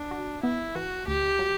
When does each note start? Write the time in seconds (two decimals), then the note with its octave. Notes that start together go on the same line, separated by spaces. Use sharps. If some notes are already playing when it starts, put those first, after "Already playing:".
Already playing: D4
0.11 F#4
0.43 B3 E4
0.75 E3 F#4
1.07 D2 G4
1.39 F#3